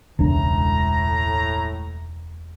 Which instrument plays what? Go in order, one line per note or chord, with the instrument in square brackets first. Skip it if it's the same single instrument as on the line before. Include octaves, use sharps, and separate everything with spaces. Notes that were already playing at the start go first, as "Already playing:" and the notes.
[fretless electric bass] E1 C#2 D4 [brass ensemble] A2 A#5